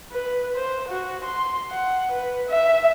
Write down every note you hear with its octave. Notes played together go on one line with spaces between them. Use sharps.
B4
C5
F#4
C6
F#5
B4
E5